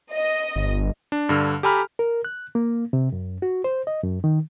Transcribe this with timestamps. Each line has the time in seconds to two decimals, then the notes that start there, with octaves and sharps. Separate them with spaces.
0.13 D#5
0.56 G1
1.12 D4
1.29 G2 D3 F6
1.63 G4 A4 G#5 A#5 B5 F6
1.99 A#4
2.25 F#6
2.55 A#3
2.93 C3
3.12 F#2
3.42 F#4
3.64 C5
3.87 D#5
4.03 F#2
4.24 D#3